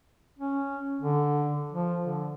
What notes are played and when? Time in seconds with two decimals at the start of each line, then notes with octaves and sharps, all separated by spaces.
0.39 C#4
1.02 D3
1.72 F3
2.02 D3